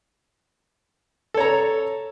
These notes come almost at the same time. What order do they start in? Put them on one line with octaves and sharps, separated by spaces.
A4 C#5 A#5